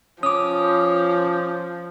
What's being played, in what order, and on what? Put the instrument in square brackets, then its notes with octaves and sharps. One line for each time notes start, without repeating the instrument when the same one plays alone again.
[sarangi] F3 [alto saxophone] C#4 [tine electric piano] D6 D#6